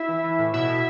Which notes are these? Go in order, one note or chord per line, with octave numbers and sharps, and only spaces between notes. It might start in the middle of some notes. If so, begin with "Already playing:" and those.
Already playing: E4 E5
E3
E3
A2
B2 E4 E5
B2